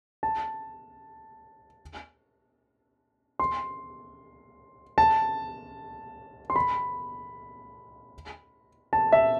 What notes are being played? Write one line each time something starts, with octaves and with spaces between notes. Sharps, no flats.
A5
C6
A5
C6
B5
A5
E5